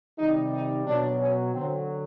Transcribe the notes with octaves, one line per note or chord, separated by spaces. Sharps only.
C3 D#3 G3 D#4
D#4
B2 F#3 D4
C#4
D3 C4
F#3